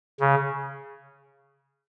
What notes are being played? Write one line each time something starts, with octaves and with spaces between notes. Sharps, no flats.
C#3